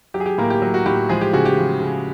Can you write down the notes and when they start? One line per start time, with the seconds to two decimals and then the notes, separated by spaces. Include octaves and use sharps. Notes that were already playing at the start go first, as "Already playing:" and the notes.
0.14 F#3 G4
0.20 G#4
0.26 G4
0.38 A2 A#3 A#4
0.50 G4
0.62 F#3
0.74 F#4
0.86 A2 G4
1.09 F3 G#3 G#4
1.21 G4
1.33 C#3 F#4
1.45 G4
1.58 F3
1.81 C#3